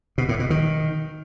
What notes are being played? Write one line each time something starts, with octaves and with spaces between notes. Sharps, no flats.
B2
A2
B2
D#3